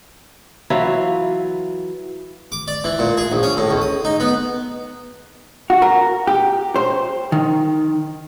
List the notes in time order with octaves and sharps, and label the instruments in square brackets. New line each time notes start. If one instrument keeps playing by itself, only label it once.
[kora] E3 F#3 E4 F4
[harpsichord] D6
D5
E3
A#2
G#4
A#1
C#4
A2
C#2
D#6
D#4
B3
[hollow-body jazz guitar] F#4
A#4
G4
C5
D#3